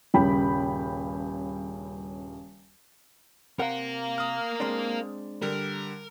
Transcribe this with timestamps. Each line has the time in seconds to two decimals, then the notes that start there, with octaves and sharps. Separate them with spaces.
0.14 D#1 G2 C#3 G5 B5
3.59 C3 A#4 F5 F#5
4.18 D#6 F6
4.60 G#3 C4 D4
5.42 D3 G3 A#4